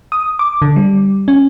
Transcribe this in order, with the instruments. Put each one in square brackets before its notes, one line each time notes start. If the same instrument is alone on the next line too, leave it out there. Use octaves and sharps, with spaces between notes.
[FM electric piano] D#6
D6
D3
G3
C#4